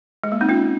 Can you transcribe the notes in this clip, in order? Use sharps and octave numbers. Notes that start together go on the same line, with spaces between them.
G#3
A#3
C4 D#4
C#4 F4